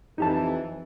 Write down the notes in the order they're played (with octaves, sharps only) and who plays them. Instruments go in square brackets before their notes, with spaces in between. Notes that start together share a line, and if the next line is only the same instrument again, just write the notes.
[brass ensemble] F2 E3 [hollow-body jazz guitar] D#4 G4 A5